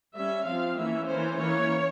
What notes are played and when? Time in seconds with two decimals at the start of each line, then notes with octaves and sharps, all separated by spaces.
0.15 G3 C#4 E5
0.46 F3 C4 F5
0.77 E3 A#3 C#4 E5
1.08 E3 A#3 C#4 C5
1.39 E3 A#3 C#4 C#5